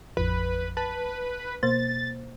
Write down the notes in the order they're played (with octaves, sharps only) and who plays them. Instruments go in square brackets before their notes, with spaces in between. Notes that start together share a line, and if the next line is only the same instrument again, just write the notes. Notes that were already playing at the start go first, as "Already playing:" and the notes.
[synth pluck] A1 F2 F3 [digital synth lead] B4
[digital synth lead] B4 [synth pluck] A5
[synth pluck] B2 A#3 C5 [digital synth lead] A6